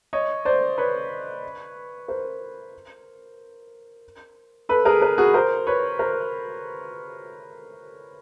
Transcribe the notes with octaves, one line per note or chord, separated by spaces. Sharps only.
C#5 D#5
C5 D5
B4 C#5
A#4 C5
A4 B4
G#4 A#4
G#4 A#4
F#4 G#4
A#4 C5
B4 C#5
A#4 C5